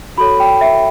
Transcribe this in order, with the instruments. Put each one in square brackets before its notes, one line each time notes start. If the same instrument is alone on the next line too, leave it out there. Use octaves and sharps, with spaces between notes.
[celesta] F#4 A4 C#5 B5
G5
E5